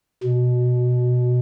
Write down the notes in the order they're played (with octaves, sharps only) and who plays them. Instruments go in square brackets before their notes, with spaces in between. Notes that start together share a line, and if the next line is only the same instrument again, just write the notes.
[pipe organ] B2